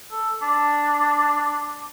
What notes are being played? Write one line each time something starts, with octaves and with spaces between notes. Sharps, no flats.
A4
D4